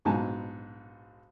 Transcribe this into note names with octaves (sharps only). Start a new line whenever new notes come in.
A#1 G#2 B2 F#3 G#5 A5